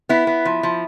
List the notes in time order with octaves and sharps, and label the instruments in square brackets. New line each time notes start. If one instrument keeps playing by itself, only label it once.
[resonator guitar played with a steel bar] B3 E4
B3
F3
F3